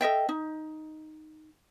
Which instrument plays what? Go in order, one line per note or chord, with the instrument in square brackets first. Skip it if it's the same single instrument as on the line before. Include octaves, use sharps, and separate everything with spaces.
[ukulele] A4 D#5 E5 G5
D#4